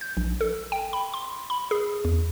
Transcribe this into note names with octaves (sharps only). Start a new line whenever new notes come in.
G6
A#1
A4
G5
B5
C6
B5
G#4
E2